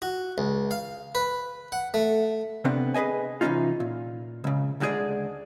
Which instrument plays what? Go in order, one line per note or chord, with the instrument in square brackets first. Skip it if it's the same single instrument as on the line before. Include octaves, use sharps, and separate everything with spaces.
[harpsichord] F#4
C#2
F5
B4
F#5
A3
[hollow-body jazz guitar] C3 B3 C4 D4
G#4 B4 C5 D#5 G#5
C3 E3 G3 C#4 D#4 F4
A#2
C#2 C#3
D2 D3 G#3 D4 G#4 D5